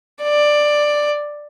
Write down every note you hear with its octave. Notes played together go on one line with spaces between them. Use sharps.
D5